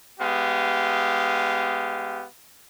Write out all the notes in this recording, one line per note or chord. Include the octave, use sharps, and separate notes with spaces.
G#3 B3 G4 F5